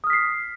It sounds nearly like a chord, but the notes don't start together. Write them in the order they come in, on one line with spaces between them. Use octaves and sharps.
D#6 F6 B6 C7